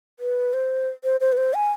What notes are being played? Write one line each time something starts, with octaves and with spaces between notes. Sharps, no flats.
B4
C5
C5
C5
B4
C5
G#5